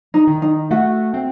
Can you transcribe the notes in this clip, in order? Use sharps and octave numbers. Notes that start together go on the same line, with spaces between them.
D#4
D#3
D#4
A3 F#4
C4